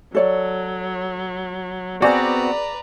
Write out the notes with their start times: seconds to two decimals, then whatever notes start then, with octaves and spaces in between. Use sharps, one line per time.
0.15 F#3 A4 C#5 D5
2.02 B3 C4 F#4 G#4 B4 D5 A#5